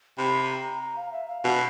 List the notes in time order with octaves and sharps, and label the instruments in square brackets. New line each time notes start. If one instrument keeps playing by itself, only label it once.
[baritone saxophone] C3 [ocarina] B5
[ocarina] B5
A#5
A#5
F5
E5
F5
[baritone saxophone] B2